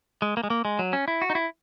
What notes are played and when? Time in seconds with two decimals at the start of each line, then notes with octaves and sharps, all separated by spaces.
0.22 G#3
0.37 A#3
0.44 G#3
0.50 A#3
0.65 G#3
0.79 F#3
0.93 C#4
1.08 E4
1.22 F#4
1.30 D#4
1.35 E4